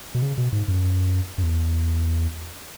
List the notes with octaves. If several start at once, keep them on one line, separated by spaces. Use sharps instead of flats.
B2
C#3
B2
G#2
F#2
F#2
E2